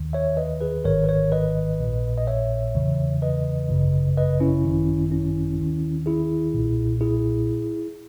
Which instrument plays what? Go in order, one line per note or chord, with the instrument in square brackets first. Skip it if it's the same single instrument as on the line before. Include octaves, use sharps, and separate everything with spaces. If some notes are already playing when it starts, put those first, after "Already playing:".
Already playing: [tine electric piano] D#2 D#3
C#5 E5
B4 D#5
G#4 B4
G#1 G#2 D#3 A#4 C#5
B4
A#4 C#5
B4 D#5
A#1 A#2
D#5
C#5 E5
E2 C#3 E3
B4 D#5
G#1 F#2 C#3
B4 D#5
C#4 E4
G#1 F#2 D#3
C#4 E4
D#2 D#3
E4 G#4
B1 A#2
E4 G#4